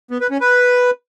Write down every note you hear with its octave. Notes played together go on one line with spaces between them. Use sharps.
B3
B4
C#4
B4